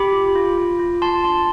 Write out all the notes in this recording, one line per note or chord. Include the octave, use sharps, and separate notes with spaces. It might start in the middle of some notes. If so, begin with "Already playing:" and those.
Already playing: G4 B5 D6
F4
F4
F4
F4
F4 A5 C6
D4 A5 C6